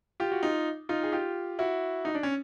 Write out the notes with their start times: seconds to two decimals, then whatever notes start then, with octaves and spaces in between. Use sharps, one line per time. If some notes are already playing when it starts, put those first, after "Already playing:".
0.20 F4 G4
0.32 F#4
0.43 D#4 F4
0.89 D#4 F4
1.03 G#4
1.12 F4 G4
1.59 E4 F#4
2.05 D#4
2.15 D4
2.23 C#4